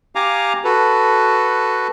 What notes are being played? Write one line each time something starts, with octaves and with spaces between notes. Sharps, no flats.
G4 F5 G#5 A#5 D6
F#4 A4 B4